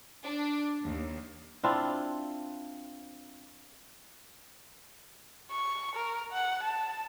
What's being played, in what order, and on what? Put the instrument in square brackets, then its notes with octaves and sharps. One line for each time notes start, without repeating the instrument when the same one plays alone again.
[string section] D4
D#2
[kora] C4 D4 E4 F4
[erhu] C#6
A#4
F#5
A5